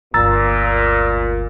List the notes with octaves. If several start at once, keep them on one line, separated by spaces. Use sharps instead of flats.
G1 D2 A#2 A#5 E6 A6